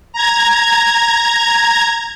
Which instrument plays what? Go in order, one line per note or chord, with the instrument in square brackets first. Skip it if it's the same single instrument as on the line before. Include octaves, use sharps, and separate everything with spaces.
[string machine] A#5 G#6